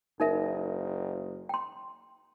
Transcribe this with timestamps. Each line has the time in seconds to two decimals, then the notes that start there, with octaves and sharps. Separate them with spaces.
0.20 F#1 D#4 A#4 E5
1.49 G5 C6